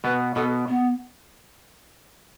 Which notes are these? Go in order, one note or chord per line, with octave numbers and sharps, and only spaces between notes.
B2 B3 B4
B2 B3 A4
B3